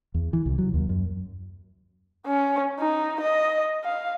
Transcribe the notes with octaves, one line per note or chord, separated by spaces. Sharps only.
E2
E3
C2
F#3
D#2
F#2
C#4
D#4
D#5
F5